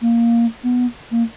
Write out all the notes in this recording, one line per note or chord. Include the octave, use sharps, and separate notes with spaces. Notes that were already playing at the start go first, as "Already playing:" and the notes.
A#3
B3
A#3